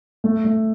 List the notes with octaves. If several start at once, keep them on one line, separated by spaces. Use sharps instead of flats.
A3
A3